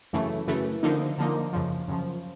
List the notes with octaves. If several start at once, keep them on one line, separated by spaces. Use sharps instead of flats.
F#2 C#3 E3 A3
F#2 C#3 E3 A3
D3 F3 A#3 D#4
D3 F3 A#3 D#4
F#2 C#3 F3
F#2 C#3 F3